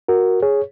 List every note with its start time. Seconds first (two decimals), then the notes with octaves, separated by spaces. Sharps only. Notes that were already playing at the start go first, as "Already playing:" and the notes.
0.08 F#4 A#4
0.42 G#4 C#5